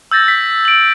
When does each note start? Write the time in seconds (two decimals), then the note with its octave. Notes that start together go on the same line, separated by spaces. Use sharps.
0.11 E6 G6 A6 A#6
0.28 B6
0.65 D7 F#7